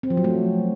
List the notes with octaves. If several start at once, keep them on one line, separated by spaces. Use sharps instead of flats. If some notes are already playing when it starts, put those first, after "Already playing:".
C4
F3
F#3
A3